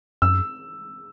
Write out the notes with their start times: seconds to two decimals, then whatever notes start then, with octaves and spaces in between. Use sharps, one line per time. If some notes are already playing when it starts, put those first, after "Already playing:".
0.22 F#2 E6